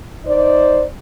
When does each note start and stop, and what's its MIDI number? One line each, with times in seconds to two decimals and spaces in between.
0.25 0.84 63
0.25 0.84 72
0.25 0.84 74